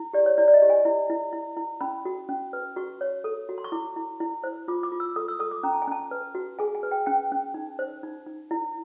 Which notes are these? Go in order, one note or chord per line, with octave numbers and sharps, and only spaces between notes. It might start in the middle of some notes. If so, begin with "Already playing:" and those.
Already playing: E4
G4 D5
C#5
E4 D5
D5
D#5
G4
G#5
E4
E4
E4
E4
C#4 B5
F#4
C#4
B4
F#4 C#6
C#5
A4
F#4
C6
C#6
E4 D6
E4
E4
C5
F4 D6
D6
F4
E6
A4 D#6
E6
A4 D#6
D6
C#4 A#5
A5
G#5
C#4 A5
B4
F#4
G#4 G#5
G#5
B4
G5
C#4 G5
C#4
D#4
C5
D#4
D#4
E4